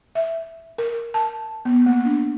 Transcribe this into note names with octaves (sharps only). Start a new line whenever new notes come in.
E5
A#4
A5
B3
A#3
D4